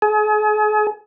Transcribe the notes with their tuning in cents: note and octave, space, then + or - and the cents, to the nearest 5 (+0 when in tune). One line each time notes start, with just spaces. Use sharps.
G#4 +40